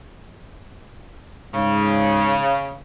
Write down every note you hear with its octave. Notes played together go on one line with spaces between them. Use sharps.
G#2 C#3